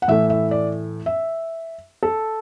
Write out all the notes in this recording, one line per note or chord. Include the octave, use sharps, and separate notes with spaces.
F#5
A2 E3 A3 E5
E5
D5
E5
A4